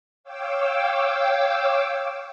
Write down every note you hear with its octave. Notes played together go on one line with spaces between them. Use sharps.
C#5 F5 G5 D6 E6